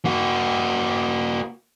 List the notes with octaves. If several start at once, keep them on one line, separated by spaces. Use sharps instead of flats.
A#3 F#4